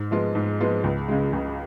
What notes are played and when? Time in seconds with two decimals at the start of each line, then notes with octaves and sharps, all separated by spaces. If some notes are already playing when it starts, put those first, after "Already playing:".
Already playing: G#2
0.11 F3 G#3 B3 F4
0.35 G#2
0.60 F3 G#3 B3 F4
0.84 C#2
1.08 C#3 G#3
1.33 C#2